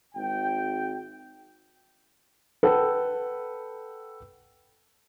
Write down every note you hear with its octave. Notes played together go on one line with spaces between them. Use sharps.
G#1 G5
A4 B4 F#5 G5